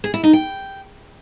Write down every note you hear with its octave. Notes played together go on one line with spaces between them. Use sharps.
G#4
E4
D#4
G5